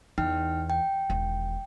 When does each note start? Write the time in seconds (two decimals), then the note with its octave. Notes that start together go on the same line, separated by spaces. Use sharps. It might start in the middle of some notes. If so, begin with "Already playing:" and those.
0.18 E2 D#4 G5 F6
0.70 G5
1.10 E1 D#3